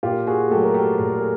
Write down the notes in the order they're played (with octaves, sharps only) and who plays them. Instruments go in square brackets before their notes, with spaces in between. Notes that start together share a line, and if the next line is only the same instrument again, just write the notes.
[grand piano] A#2 F4 G4
F#4 G#4
F#3 A3 G4 A4
A#4
G4 A4
A#2 A#4
A4
G#4